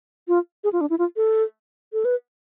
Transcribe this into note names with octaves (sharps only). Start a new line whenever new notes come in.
F4
G#4
F4
D4
E4
F4
A4
A4
B4